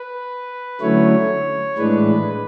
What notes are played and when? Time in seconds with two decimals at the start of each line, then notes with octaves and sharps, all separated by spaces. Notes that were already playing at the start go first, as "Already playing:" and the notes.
Already playing: B4
0.81 D3 F#3 A3 C#4 E4 C#5
1.78 A2 E3 G#3 D4 B4